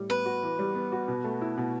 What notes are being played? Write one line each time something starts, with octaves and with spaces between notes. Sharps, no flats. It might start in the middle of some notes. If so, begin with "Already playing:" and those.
Already playing: A2 G3
B3 B4
F#4
E3
G3
B3
F#4
B2
A3
E4
B2